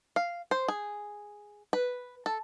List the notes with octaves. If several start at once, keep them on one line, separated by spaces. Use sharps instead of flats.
F5
C5
G#4
B4
A4